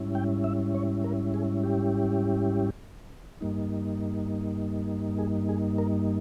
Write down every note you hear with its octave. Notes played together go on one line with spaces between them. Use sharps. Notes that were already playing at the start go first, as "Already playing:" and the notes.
Already playing: G#2 G3 C#4 E4
G5
E5
C#5
A#4
G#4
G4
G2 G3 A#3 D#4
G#4
G#4
A#4